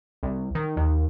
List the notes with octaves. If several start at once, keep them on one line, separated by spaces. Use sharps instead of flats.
C2
D#3
D#2